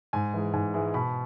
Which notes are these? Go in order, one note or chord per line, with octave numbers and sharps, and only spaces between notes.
G#2 G#5
E3 G#3
G#2 G#5
E3 G#3
B2 B5